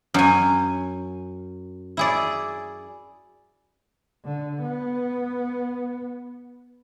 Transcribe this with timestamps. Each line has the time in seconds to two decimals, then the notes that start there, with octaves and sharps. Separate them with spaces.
0.14 F#2 G#5
1.97 E4 G#4 D5
4.25 D3
4.63 B3